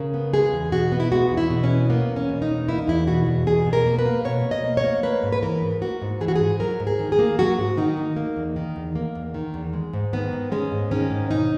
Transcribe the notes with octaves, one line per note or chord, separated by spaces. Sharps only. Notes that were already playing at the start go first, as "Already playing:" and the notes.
Already playing: C#3 A#4
B3
G#3 G#4
E2
B2 F#4
B3
E4
G#3 F#4
E2
E4
B2
C#4
B3
A#3 B3
E2
C#4
B2
D#4
E2
A#3 E4
D#4
E2 E4
B2 F#4
E2
B2 G#4
B2
A#4
A#3
B4
A#3
B2 C#5
B2
D#5
A#3
C#5
A#3
A#3 B4
G#2
B4
E3 A#4
G#2
A#3 F#4
G#2
E3 G#4
F#4
G#2 G#4
F#3 A#4
G#2
G#4
D#3
G#4
A#3
F#3 F#4
G#2
D#3 D#4
A#3
A#3
E2
D#3
E2
A#3
E2
D#3
E2
G#3
G#2
D#3 B3
G#2
G#3 C#4
G#2
D#3 C#4
G#2
B2 D#4